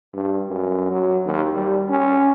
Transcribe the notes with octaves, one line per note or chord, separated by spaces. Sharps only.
G2
F#2
F#3
D#2
G3
C#4